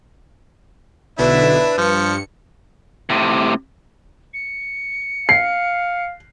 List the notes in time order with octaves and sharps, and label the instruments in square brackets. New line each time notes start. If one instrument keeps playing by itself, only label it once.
[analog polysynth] B1 B2 D3 [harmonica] D4 E4 E5 [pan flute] B4
[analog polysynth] G2 C#7 [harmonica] F3
[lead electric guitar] A2 C3
[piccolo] C#7
[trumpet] F5 [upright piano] C7